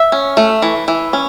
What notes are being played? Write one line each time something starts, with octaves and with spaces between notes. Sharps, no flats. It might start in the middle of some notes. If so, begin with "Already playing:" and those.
Already playing: E5
C#4
A3
E3
E3
C#4